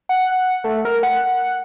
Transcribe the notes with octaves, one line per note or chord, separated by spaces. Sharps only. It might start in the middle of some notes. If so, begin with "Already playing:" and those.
F#5
A3
A#4
F#5